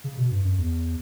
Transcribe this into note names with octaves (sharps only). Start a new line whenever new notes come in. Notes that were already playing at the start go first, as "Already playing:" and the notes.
C#3
B2
G2
F#2
E2